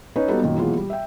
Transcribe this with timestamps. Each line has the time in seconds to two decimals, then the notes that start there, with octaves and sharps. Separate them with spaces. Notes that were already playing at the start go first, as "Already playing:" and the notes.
0.16 C#4 D#4 B4 C#5
0.28 G3 B3 D#4 F#4 A4
0.42 F#2 A#2 D#3
0.56 B2 E3 F#3 G#3 A#3 F4
0.77 G3
0.90 E5 G5